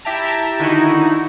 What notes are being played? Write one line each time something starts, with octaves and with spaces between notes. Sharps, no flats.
E4 G4 E5 G5 A5 A#5
D3 D#3 D#4 E4 F#4